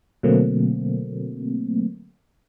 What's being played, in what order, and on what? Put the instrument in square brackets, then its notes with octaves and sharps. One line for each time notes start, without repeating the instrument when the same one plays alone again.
[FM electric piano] B2 D3 F#3 A3 A#3 C4